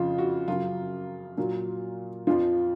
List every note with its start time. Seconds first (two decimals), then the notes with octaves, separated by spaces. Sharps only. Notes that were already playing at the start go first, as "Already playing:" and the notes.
Already playing: F2 C#3 F3 F4
0.18 F#4
0.48 F#2 C#3 F#3 F4
1.37 A#2 F#3
2.27 F2 F3 F4